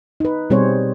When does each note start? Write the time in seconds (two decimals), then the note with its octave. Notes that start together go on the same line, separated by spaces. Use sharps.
0.20 D#4 B4
0.50 B2 G3 C4 G#4 C5 C#5